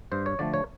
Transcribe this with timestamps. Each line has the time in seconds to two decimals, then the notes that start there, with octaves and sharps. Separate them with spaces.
0.12 G2 C5
0.26 C#5
0.39 D3 F3 A3 D5
0.54 C#5